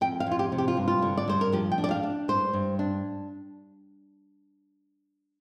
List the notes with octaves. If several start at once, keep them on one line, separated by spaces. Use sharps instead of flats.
F2 G5
F5
F2 F4
G4
C3
G4
F4
G2
F4
D3
D5
G2 C5
A#4
F3 G4
G5
D4
D5
F5
D4
G2 C5
G2
D4